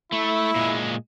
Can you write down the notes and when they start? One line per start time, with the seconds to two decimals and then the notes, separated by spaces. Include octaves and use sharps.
0.12 A3 E4
0.56 A#2 G#3